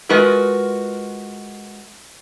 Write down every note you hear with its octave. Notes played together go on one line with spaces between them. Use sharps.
G#3 F4 F#4 A#4 B4